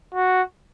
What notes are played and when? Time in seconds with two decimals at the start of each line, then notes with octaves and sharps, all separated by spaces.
0.15 F#4